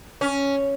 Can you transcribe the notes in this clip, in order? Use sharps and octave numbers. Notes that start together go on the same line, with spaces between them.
C#4